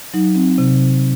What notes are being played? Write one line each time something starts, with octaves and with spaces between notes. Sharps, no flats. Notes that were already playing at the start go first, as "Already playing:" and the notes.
F#3 D#4
C4
C3